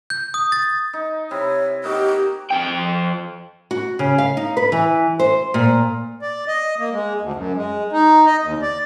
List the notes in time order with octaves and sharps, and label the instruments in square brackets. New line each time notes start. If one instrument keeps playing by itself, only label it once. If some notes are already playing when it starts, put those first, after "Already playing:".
[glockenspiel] G6
D#6
A6
[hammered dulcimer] D#4
[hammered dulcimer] C3 E4 [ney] C#5
[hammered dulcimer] A#3 D#4 F#4 [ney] G4
[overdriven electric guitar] F2 G5
[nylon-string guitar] F#4
C#3
F5
D#4
B4
E3
C5
A#2
[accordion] D5
D#5
A#3
G#3
D2
F#2
G#3
D#4
D#5
D#2
D5